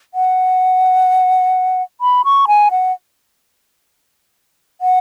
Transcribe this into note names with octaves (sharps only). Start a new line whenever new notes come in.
F#5
B5
C#6
G#5
F#5
F#5